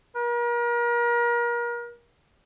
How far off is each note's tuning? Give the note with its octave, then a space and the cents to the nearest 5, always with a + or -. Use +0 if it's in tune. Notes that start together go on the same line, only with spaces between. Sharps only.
A#4 +35